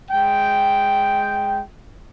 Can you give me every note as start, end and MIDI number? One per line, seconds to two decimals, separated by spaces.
0.11 1.62 56
0.11 1.62 79